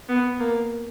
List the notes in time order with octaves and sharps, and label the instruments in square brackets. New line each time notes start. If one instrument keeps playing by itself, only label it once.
[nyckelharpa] B3
A#3